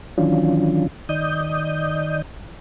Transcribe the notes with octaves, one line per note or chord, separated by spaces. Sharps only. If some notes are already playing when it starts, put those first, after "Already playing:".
D#3 E3 F#3 C#4 D4 F4
D#3 D5 D#5 D#6 G6